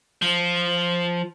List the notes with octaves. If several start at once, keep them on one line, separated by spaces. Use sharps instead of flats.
F3